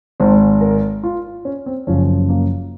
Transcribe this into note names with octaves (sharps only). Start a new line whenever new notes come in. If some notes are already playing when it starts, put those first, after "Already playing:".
G#1 G#2 D#3 C5
A#4
F4
C#4
C4
F#1 F#2 C#3 F3 C#4
A#3